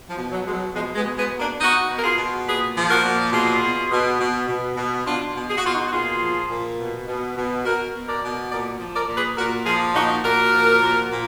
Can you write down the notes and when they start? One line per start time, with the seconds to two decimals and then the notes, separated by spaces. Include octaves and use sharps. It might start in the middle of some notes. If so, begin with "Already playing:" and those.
0.09 F3
0.16 B2
0.31 F#3
0.45 B2 G#3
0.52 F#3
0.74 B2 F3 G#3
0.95 G#3 B3
1.03 B2
1.17 G#3 B3
1.31 B2
1.38 A#3 D4
1.60 B2 D#4 F#4
1.89 B2
1.97 A#4
2.03 F4 G#4
2.17 B2
2.46 A#2 G#4 B4
2.75 F3
2.89 F#4 A#4
3.04 A#2
3.32 B2 F4 G#4
3.62 B2
3.90 B2
4.19 B2
4.47 B2
4.77 B2
5.05 B2 D4 F4
5.34 B2
5.49 G#4
5.57 F#4
5.63 B2 F4
5.72 D#4 F#4
5.86 F#4
5.92 A#2 F4 G#4
6.20 F3
6.49 A#2
6.78 B2
7.07 B2
7.36 B2
7.64 B2 F#4 A#4
7.93 B2
8.07 A#4 D5
8.22 B2
8.50 A#2 A#4 D5
8.79 F3
8.94 A#4 D5
9.08 A#2
9.15 G#4 B4
9.37 A#2 F#4 A#4
9.65 F3 F4 G#4
9.94 A#2 D#4 F#4
10.23 A#2 F#4 A#4
10.52 F3
10.81 A#2
11.09 A#2